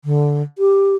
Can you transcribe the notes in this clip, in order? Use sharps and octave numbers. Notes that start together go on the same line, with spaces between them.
D3
G4